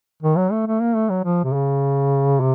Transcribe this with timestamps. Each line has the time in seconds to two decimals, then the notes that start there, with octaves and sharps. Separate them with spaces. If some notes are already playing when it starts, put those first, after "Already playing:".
0.22 D#3
0.37 F#3
0.52 A3
0.66 A3
0.81 A#3
0.95 A3
1.09 F#3
1.24 F3
1.44 C3
1.53 C#3
2.40 C3